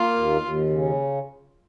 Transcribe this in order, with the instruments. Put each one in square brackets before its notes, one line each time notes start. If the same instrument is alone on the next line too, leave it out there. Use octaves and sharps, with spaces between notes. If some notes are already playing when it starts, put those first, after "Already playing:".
Already playing: [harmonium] A#3 [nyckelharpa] F4
[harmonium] D#2
D#2
C#3